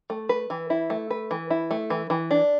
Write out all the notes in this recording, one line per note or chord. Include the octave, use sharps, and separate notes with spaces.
A3
B4
E3
E4
A3
B4
E3
E4
A3
E3
E3
D4